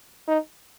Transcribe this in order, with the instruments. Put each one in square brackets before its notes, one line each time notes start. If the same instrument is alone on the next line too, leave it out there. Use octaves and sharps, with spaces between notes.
[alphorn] D#4